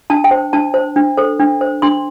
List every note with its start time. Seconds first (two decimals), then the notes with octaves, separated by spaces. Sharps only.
0.10 D4 A5
0.24 G5
0.31 C5
0.53 D4 A5
0.74 C5
0.96 D4
1.18 A4 C5
1.40 D4
1.61 C5
1.82 D4 C6